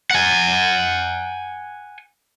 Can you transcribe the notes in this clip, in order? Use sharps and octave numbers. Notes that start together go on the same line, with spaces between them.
F#5 G#5